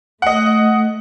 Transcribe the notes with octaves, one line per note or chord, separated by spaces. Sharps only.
A3 D#5 F#5